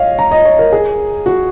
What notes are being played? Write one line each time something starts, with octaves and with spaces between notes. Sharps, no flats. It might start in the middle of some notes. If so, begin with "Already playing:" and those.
Already playing: C#5 D#5 F5
A#5
D#5
C#5
A#4
G#4
F#4